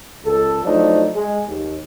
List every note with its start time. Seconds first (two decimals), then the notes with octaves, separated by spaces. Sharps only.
0.24 C#2 A4
0.63 F3 F#3 A3 D4 D#4
1.14 G#3
1.47 D#2